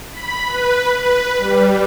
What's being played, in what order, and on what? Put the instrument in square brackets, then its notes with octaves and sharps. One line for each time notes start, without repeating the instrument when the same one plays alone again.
[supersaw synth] B5
B4
B4
G3